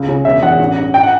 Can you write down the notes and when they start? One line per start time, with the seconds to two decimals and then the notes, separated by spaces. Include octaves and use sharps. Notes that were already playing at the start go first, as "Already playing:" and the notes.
Already playing: C#2
0.08 C#3
0.25 E1 E5
0.43 E2 F#5
0.59 A1
0.77 G2
0.94 G5
1.03 F#5